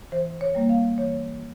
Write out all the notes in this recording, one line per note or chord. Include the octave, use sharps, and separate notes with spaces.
E3 C5
C#5
G3 A#3
F5
E3 C#5